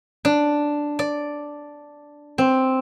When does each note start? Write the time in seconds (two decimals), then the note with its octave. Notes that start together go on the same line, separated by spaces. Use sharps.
0.25 D4
0.99 D5
2.38 C4